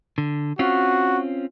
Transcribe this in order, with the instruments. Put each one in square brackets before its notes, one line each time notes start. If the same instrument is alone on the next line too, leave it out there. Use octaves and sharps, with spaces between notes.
[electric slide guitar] D3
[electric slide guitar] C4 C#4 F4 [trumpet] F#4